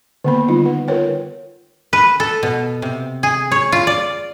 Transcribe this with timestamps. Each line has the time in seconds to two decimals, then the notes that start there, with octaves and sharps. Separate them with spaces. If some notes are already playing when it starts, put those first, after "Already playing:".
0.24 D3 D#3 A#3 B3 B5
0.48 G3 D#4 F4
0.65 B4 F#5
0.88 F4 A#4 B4 C#5 G5
1.93 B4
2.20 A4
2.43 B2
2.82 C3
3.23 G#4
3.52 C#5
3.72 F4
3.87 D5